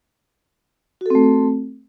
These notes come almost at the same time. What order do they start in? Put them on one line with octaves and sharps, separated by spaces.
F#4 A4 C4 A3